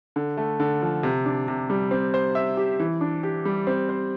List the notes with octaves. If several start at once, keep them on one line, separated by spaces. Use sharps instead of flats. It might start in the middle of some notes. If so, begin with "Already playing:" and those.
D3
A3
D3
F3
C3
D4
C3
G3
C4
C5
E5
G4
E3
D4
G4
G3
C4
C5